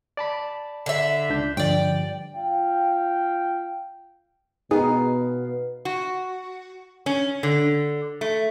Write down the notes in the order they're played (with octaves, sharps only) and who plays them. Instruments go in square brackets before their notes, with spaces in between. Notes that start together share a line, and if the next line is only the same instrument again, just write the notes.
[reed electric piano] D5 A5 B5
[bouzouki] D3 E5
[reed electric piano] C#2 D4 G6
[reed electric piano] G2 D3 F3 [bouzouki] D5 G5
[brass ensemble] F4 F5 G5
[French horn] B2 [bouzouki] B3 F5 [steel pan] D#4 [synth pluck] G#4
[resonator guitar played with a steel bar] F#4
C#4
D3
A3